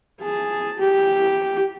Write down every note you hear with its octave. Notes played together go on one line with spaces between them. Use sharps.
G#4 A5
G4